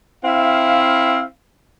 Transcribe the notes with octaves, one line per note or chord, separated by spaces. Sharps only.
C4 E4 E5 F5